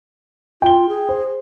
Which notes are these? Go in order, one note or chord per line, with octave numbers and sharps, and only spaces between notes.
F4 G5 G7
G#4
C5